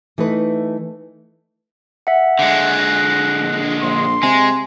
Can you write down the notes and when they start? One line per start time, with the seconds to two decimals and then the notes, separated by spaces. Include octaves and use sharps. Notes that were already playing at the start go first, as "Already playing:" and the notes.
0.18 E3 A3 D#4 B4
2.07 E5 F#5
2.39 D3 G#3 F#6
2.79 A#6 C7
3.41 A#1
3.82 A#1 C6
4.23 C3 G#3 G#5